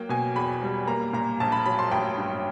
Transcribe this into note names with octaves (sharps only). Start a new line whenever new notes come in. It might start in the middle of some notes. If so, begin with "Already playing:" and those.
Already playing: F#3 A#3 G5
B2 G#5
E2 B5
G3
A#3 A#5
A#2 A#5
A#1 A5
B5
F#3 B5
C6
A1 G5
G2